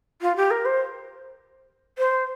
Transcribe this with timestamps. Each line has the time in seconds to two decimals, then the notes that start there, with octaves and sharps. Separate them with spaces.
0.21 F4
0.36 G4
0.51 A#4
0.65 C5
1.98 C5